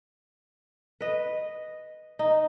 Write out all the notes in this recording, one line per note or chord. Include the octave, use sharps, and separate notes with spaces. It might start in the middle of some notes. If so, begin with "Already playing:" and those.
B4 D#5
D#4